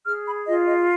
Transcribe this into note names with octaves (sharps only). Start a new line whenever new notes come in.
G#4 F6
B5
F4 D#5
D#5